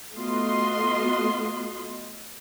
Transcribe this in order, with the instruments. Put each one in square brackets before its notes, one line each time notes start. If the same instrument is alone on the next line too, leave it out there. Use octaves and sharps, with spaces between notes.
[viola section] A3 B3 F4 F#4 D#5 C6